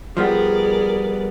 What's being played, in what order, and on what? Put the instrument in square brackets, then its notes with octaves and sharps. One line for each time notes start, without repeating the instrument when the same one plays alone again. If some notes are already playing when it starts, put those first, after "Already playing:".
[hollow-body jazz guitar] F3 G3 B3 [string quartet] G#4 A#4 D5